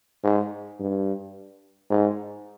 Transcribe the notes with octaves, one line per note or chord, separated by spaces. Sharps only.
G#2
G2
G#2